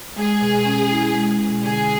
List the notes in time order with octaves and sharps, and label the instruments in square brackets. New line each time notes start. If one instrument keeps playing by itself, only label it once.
[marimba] G#3 [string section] G#4
[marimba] B2
C#4
E4
G#3
B2
[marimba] D3 [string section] G#4